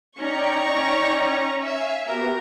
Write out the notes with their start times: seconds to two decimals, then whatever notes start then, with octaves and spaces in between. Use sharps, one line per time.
0.17 C#4 D#4 D5 G5 A#5 C#6
0.74 C#4
1.64 E5 F5 G#5 F6
2.07 B3 F#4 G4 A#4